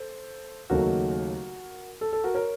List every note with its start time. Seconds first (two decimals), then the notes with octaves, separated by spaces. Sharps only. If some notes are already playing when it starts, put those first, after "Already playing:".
Already playing: A4 C5
0.70 D#2 C#3 F#3 A3 D#4 F#4 A#4
2.01 A4
2.13 A4
2.24 F#4 A#4
2.34 A#4 C#5